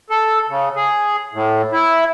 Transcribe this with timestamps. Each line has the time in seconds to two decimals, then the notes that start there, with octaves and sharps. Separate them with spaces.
0.10 A4
0.49 C#3
0.76 G#4
1.33 A2
1.72 E4